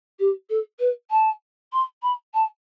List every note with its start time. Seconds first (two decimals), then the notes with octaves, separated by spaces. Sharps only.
0.19 G4
0.49 A4
0.79 B4
1.11 A5
1.72 C6
2.02 B5
2.34 A5